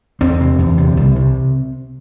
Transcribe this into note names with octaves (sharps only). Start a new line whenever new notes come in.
E2 C4
C3
E2
C3
C2
C3